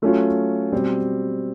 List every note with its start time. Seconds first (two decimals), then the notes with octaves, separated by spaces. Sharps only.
0.02 F#3 A3 C#4 F4
0.72 B2 G3 C4